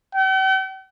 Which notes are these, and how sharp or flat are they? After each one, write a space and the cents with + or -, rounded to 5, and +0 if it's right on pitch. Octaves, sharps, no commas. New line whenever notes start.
G5 -45